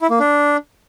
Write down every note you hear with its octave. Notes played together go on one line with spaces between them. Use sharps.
E4
A#3
D4